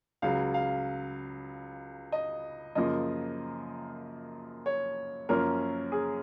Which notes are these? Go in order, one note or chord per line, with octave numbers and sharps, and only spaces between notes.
C#2 C#3 F#3 F5
F5
D#5
F#2 C#3 F3 A#3 D#5
C#5
F#2 F3 A#3 C#4 A#4
G#4